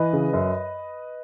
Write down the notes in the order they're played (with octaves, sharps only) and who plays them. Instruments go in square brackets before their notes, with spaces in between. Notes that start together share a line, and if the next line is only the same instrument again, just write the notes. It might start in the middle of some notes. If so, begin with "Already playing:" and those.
Already playing: [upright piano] E3 B4 D#5
C#3
F#2